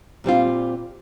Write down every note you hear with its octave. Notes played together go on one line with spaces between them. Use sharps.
A#2 G3 C4 F4